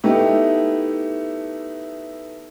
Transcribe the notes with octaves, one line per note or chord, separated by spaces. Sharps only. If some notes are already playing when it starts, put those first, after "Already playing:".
A3 B3 D#4 E4 G4